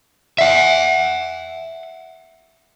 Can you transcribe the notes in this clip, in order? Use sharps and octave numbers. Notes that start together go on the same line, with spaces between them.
E5 F#5